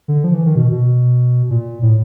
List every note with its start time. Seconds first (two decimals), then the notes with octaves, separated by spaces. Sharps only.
0.08 D3
0.24 F3
0.34 E3
0.46 D#3
0.56 B2
0.71 B2
1.50 A#2
1.82 A2